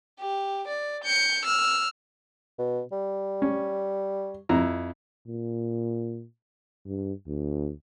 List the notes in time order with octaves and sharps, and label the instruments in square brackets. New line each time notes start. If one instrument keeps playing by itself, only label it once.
[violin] G4
D5
G6 C#7
E6 F6
[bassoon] B2
G3
[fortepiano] C#4
F2 E4 A#5
[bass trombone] A#2
G2
D2